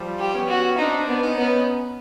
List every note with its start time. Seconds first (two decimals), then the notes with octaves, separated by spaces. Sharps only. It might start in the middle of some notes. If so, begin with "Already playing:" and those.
Already playing: F3 G3
0.19 G4
0.33 B3 C#4
0.49 F#4
0.77 C4 D4 D#4
1.07 B3
1.21 C#4 D#4
1.36 B3